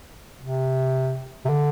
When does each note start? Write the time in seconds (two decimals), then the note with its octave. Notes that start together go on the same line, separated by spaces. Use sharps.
0.39 C3
1.45 C3
1.49 D3